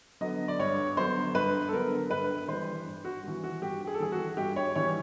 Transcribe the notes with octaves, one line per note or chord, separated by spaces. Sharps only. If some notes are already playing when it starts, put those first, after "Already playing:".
D3 F#3 B3 D#5
D5
G2 C#5
D3 F#3 B3 C5
G2 B4
A4
D3 F#3 B3 A#4
G2 B4
E3 G3 C5
G2
F#4
E3 G3
F#4
G2 G4
G#4
A4
E3 G3 G#4
F#4
G2 G4
C#5
E3 G3 C#5